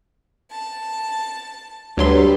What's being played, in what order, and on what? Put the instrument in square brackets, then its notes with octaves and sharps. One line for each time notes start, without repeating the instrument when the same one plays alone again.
[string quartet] A5
[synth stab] D2 F#3 C6 [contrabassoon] G2 [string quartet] G4 A4 B4